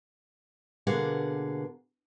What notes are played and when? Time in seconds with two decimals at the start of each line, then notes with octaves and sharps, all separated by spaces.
0.87 B2 D3 A#3 G#4 F5 F#5